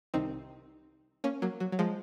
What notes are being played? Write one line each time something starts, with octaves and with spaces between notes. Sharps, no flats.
C2 C3 D#3 C4 D#4
A#3 C#4
F#3 A#3
F#3
F#3
F3 G#3